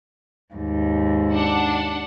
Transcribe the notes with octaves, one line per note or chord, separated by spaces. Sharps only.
D#2 G#2
D4 F#5